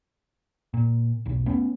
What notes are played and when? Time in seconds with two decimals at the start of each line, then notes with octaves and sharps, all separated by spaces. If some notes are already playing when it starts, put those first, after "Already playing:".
0.74 A#2
1.26 E1 B1
1.46 A3 B3 C#4